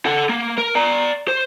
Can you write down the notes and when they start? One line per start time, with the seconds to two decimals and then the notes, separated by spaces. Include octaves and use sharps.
0.05 A4 F#5
0.29 A#3
0.58 A#4
0.75 D5 A#5
1.28 C5